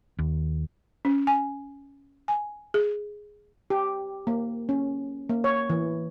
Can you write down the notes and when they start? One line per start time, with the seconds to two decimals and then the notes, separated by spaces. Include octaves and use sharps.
0.19 D#2
1.05 C#4
1.27 G#5
2.28 G#5
2.74 G#4
3.70 G4
4.27 A#3
4.69 C#4
5.29 A#3
5.44 C#5
5.70 E3